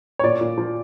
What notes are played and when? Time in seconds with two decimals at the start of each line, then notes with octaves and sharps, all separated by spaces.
0.19 C#5
0.23 A#2 D5
0.41 A#2
0.58 F3